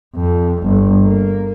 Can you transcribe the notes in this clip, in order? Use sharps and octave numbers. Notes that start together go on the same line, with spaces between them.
F2
G1
A#3